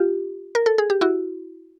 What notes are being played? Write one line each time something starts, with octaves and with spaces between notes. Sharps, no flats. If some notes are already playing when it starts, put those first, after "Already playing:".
Already playing: F4 G4
A#4
A4
G#4
G4
E4 F#4